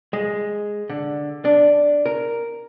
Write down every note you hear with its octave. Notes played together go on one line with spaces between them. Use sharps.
G#3
D3
D4
A#4